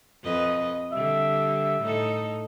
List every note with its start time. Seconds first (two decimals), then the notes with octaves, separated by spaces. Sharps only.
0.23 F2 B4 D#5
0.92 D3 G3 E5
1.81 A2 D#4 A4